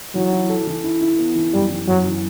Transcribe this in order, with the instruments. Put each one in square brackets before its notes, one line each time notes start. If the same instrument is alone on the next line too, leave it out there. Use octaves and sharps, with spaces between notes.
[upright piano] E3 [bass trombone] F#3
[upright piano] E4
A4
E3
E4
E4
B3
E3
[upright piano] F#2 [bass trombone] G3
[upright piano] E3
[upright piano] F#2 [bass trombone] F#3
[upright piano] E3